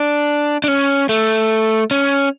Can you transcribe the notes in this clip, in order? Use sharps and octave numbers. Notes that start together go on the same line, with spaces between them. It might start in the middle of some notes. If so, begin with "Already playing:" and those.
Already playing: D4
D4
C#4
A3
C#4